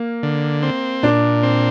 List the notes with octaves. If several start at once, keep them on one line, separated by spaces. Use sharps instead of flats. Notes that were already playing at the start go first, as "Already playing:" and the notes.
Already playing: A#3
D3
C4
A#2 D4
C4